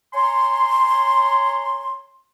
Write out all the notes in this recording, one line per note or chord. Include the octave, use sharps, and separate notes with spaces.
C#5 G#5 A#5 C6